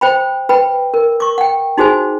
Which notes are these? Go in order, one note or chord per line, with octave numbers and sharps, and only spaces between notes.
C5 G5 B5
B4 G5 B5
A#4
C#6 D6
F#5 G5
D#4 F#4 G#4 C5 G#5